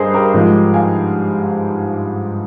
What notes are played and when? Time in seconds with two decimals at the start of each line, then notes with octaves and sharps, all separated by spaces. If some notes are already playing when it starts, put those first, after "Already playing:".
Already playing: G2 G#4 A#4 C5 D#5
0.14 G4 A#4
0.34 G#2 F3 G#3
0.74 F5 G#5